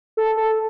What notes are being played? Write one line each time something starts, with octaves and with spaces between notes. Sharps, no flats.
A4
A4